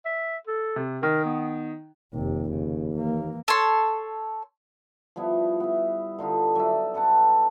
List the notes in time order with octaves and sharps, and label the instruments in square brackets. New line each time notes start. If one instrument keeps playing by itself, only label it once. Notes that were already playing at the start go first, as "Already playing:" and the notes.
[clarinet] E5
A4
[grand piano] C3
[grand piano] D#3 [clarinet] A#4
[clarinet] B3
[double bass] F1 C3 [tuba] D#2
[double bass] C#3
E3 A#3
[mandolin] A4 C#5 C6
[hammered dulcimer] F3 G3 B3 E4
B3 E5
D3 D#4 F4 G4
F#3 D#4 D5 E5
A4 B4 F#5 A5